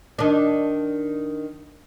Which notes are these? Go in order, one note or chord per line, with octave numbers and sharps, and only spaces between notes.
D#3 D4